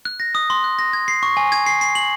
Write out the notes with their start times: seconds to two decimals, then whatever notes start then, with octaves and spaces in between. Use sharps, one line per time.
0.05 F#6
0.20 A#6
0.35 D#6
0.50 C6
0.64 F#6
0.79 A#6
0.93 G#6
1.08 C7
1.23 C#6
1.37 G#5
1.52 G#6
1.66 C7
1.81 C7
1.95 F#7